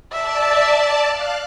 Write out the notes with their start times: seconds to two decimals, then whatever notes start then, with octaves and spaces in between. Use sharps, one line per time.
0.12 D5 E5 A5
1.08 F5 F#6